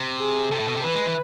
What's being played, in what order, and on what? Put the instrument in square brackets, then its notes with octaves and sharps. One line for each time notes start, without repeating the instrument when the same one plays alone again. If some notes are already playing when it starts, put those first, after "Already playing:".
Already playing: [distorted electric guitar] C3
[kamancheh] G#4
[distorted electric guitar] C3 [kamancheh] A4
[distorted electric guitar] A2
B2
C3
[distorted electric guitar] E3 [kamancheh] B4
[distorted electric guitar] G#3
E3